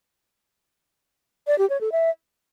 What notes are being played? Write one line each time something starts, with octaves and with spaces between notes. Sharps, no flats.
D5
G4
C#5
A4
E5